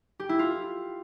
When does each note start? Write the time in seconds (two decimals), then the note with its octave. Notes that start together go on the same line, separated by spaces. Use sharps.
0.20 G4
0.29 E4
0.39 F4